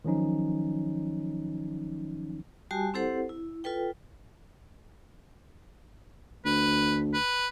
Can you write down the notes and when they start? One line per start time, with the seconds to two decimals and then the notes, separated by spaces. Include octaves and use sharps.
0.05 D#3 F3 F#3 C#4 D#4
2.71 G3 F#4 G4 G#5 A5
2.94 C4 E4 G4 A4 C5 F#5
3.29 E4
3.64 F4 A4 B4 G5
6.45 D2 B4
7.14 B4